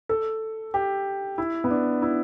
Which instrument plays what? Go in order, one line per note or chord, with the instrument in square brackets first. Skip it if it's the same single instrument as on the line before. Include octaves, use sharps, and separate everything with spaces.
[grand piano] A4
G4
E4
B3
D4
E4